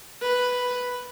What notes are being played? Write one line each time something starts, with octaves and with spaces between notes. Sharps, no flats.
B4